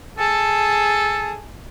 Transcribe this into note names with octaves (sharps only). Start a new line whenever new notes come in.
G#4 A4 A5